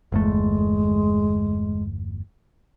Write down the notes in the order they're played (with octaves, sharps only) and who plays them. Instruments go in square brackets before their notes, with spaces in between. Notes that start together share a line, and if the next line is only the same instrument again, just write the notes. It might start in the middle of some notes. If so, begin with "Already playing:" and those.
[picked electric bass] G1 E2 A3 [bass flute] G#3